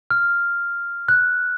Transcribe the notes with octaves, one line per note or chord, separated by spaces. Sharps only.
F6
F#6